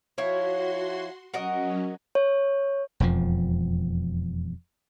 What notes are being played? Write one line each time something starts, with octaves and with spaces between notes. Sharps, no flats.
F3 E4 F#4 C#5 C6
F#3 C#4 F#4 A#4 D#5
C#5
E1 F2 F3